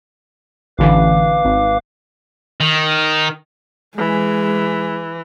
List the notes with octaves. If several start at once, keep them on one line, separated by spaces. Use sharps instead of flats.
A1 D3 E3 B4 F5 D6
G#1
D#3
E3 G#3